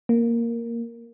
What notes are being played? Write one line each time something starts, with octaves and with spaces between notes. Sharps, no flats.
A#3